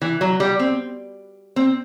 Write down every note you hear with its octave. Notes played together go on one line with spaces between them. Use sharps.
E3
F#3
G3
C4
C4